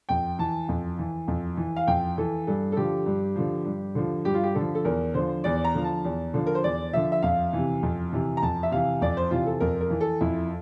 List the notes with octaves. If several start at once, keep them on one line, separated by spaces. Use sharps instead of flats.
F2 G5
E3 A5
F2
E3
F2
E3
F5
F2 G5
E3 A4
G2 A4
A4
D3 F3 G4
G2
D3 F3
G2
D3 F3
G2 G4
F4
G4
D3 F3 A4
A4
E2 A#4
D3 F3 C5
E2 D5
A#5
D3 F3
A5
E2
D3 F3
A#4
C5
E2 D5
D3 F3 E5
E5
F2 F5
C3 E3
F2
C3 E3
A#5
F2 A5
E5
C3 E3 F5
F2 D5
C5
C3 E3 F4
A4
F2 A#4
A#4
E3
A4
F2 E4